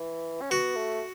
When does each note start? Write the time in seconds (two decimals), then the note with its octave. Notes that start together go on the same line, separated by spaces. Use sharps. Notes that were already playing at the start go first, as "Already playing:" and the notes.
Already playing: E3
0.41 C#4
0.51 B3 F#4
0.76 A3